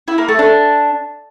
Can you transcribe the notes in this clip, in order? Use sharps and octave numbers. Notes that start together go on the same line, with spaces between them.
E4
A#3
A3
D4